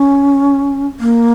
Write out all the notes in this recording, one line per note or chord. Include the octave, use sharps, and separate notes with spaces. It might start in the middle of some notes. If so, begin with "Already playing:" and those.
Already playing: C#4
A#3